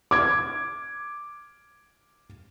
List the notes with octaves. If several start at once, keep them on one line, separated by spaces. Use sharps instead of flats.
D6 G#6